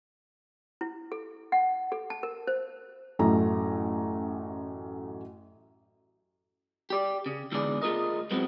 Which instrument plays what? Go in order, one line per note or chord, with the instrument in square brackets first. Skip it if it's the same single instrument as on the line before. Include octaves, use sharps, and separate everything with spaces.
[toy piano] E4
A4
F#5
A4
A5
A#4
C5
[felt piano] A1 F#2 A3 A#5
[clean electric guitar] G4 D5
C#3
G#2 D3 E3 B3 G#4 D5
A3 F4 G#4 A#4 D#5
F#2 A2 F#3 G#3 B3 C4